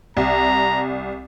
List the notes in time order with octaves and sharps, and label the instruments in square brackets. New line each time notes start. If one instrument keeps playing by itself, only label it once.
[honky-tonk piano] C2 [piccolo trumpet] A#5